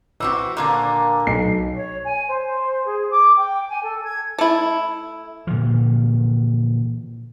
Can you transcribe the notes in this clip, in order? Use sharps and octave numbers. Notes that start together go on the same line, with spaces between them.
E3 C4 F#4 D6 E6
A#2 D3 A#3
B1 C7
C#5
G#5
C5
G#4
D6
G5
G#5
A4
G#6
A3 E4
A#2 D3 E3 F3